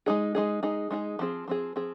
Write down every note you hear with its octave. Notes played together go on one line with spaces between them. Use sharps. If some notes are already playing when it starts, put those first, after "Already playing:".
G#3 D#4 G#4
G#3 D#4 G#4
G#3 D#4 G#4
G#3 D#4 G#4
F3 C4 G#4
F3 C4 G#4
F3 C4 G#4